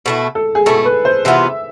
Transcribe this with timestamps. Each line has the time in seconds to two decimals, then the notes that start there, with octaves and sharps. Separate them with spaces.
0.06 B2 A3 E4
0.35 A4
0.55 G#4
0.66 B2 A3 E4 A4
0.85 B4
1.05 C5
1.25 C3 E3 B3 F4 E5